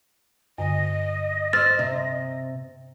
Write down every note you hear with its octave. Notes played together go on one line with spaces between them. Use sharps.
G2 D3 D#5
C5 E6 F6 A6
C3